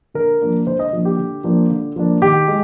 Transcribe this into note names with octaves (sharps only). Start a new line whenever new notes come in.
D3 A#4
F3 A#3 D4
D3 C5
D#5
F3 A#3 D4
G4
D3
F3 A#3 D4
D3
F3 A#3 D4
D#3 G4
G#3